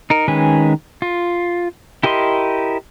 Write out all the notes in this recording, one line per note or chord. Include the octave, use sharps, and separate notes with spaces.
D#4 A#4
D#3 G#3 C#4 B4 G#5
F4
E4 G4 A#4 D#5 C6